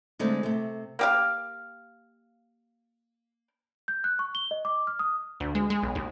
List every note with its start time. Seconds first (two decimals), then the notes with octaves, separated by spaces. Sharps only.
0.19 D3 G#3 A3 C4 D#4
0.43 C3 A3
0.99 A#3 G4 F5
3.88 G6
4.04 F#6
4.19 C#6
4.35 G7
4.51 D#5
4.65 D6
4.87 F6
4.99 D#6
5.40 D2
5.55 G#3
5.70 G#3
5.83 B1
5.95 D#2